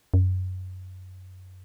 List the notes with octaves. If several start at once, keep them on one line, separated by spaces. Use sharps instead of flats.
F#2